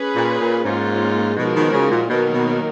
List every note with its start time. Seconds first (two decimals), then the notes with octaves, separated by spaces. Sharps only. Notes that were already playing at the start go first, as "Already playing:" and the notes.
Already playing: C#4 G#4 B4
0.16 A#2
0.40 A#2
0.64 G#2 A#3 C#4 F4
1.36 B2 F3 G#3 D#4 F#4 A#4
1.55 B2 D#3
1.73 C#3
1.91 A#2
2.09 B2 D#3 F#3 A#3 D#4 A#4
2.33 B2